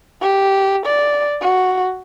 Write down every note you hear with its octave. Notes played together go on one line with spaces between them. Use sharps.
G4
D5
F#4